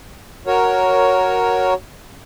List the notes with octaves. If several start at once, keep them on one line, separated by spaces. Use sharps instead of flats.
F#4 A#4 C#5